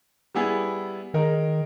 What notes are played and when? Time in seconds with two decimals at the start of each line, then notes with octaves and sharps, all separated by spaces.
0.35 G3 B3 E4 G#4
1.14 D#3 G#3 D#4 A#4